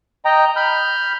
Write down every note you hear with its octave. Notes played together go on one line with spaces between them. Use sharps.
D#5 G5 A#5
B5 F6 G6